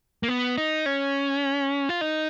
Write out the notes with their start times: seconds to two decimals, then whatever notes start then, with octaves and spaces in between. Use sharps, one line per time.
0.23 A#3
0.28 B3
0.57 D#4
0.86 C#4
1.89 F4
2.01 D#4